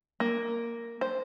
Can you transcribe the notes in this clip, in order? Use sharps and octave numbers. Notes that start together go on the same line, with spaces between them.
A#3
C5